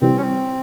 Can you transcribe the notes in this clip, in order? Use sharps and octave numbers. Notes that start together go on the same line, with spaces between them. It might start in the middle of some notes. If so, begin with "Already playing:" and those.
C3 E3 G3 C4
C#4
C4